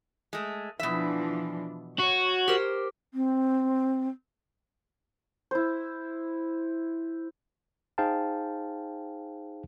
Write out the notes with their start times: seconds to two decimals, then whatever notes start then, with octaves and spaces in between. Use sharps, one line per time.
0.33 G#3 A3
0.80 B2 E3 F3 D4 E5
1.99 F#4 C#5
2.48 G4 A#4 C5
3.14 C4
5.51 E4 C5
7.98 D#4 G#4 C5 F5 G5 A5